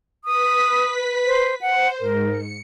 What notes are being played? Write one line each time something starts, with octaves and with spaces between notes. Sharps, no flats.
B4 D#6 B6
C5
C5 F#5
G#2 A#4
C#7